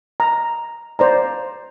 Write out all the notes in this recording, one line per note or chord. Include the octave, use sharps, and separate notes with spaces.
A#5
C5 D5 A#5